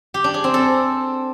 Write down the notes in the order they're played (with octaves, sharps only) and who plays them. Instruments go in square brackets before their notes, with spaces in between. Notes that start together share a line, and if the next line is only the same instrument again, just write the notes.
[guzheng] G4
D4
G#4
C4
A4